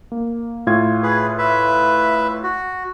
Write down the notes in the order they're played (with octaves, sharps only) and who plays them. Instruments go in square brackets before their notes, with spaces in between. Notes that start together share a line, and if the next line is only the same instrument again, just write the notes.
[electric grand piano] A#3
A2 F4 G#6
[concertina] G#4 B4
B4 E5
F#4